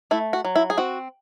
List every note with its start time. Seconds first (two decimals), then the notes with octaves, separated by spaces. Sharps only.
0.11 A3 E4
0.33 F#4
0.45 F#3
0.56 E4
0.70 G#4
0.78 C4 F#4